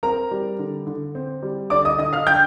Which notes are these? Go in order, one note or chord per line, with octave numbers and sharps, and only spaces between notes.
C4 A#4 A#5
G3
D3
D3
C4
G3
D3 D5 D6
D#5 D#6
D3 D#5 D#6
F5 F6
D4 G5 G6